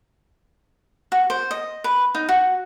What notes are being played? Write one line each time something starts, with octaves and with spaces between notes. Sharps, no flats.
F#4
C5
D#5
B4
D#4
F#4